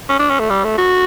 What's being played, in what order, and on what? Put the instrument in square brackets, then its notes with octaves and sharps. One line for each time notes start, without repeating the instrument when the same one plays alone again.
[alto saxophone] C#4
D4
C#4
A3
G3
A3
F#4